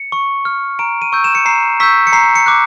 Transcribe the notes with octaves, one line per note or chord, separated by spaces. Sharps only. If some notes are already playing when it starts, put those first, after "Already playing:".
Already playing: C#7
C#6
F6
A#5 D7
D#7
C#6 E6 G6
E7
C#7
A#5 C7
C#6 E6 G6 B6
C#7
A#5 C7
C#7
D6 F#6